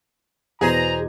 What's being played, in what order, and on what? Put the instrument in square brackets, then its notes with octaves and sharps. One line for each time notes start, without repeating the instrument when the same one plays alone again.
[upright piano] E2 B2 [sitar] G#4 C5 [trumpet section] A#5